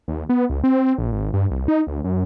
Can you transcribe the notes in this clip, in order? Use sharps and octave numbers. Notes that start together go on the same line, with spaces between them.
D#2
B3
C#2
C4
A#1
G#1
G2
C2
D#4
D2
F#2